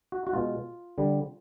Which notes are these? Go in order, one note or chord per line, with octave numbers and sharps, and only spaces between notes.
F#4
F#4
B2 G#3 F4
D3 G3